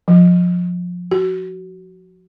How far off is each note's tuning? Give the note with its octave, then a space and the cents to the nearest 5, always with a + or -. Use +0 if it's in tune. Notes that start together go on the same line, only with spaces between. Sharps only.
F3 +25
F#4 +20